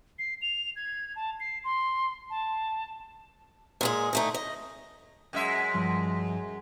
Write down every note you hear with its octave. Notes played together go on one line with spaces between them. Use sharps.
C7
F7
G#6
A5
C7
C6
A5
A#2 G#3 G#4
D3 A3 D#4
D#5
F#2 G#3 E5
G2 F3 C6